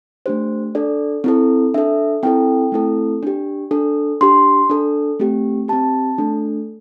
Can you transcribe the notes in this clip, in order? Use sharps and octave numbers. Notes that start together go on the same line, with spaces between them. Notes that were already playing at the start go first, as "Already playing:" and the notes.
A3 D4 G4 C5
D4 A4 D5
C4 E4 A4
D4 A4 E5
C4 E4 A4 G5
A3 C4 E4 A4
D4 G4
D4 A4
D4 G4 C6
D4 A4
A3 C4 G4
C4 G4 A5
A3 D4 A4